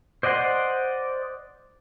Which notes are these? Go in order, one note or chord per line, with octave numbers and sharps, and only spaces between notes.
C5 D5 D#5 F#5 C6